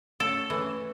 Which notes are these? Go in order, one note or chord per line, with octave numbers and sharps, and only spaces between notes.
A3 C#4 A4
E3 A3 C#4